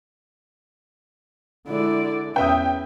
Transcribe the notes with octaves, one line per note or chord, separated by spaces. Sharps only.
D3 G#3 E4 D5
E2 C#4 B4 E5 G5 D#6